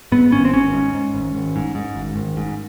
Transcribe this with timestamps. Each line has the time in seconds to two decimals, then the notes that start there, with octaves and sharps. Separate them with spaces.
0.12 G#2 B3
0.32 G#1 C#4
0.45 C4
0.53 G#1 C#4
0.74 G#2
0.94 G#2
1.14 G#1
1.35 G#1
1.56 G#2
1.75 G#2
1.96 G#1
2.16 G#1
2.37 G#2